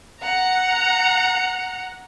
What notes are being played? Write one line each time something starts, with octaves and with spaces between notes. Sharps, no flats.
F#5 A#5